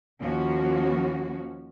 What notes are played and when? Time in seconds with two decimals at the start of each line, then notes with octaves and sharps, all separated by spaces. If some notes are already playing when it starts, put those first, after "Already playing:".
0.21 D#2 F3 A#3 C#4 F#4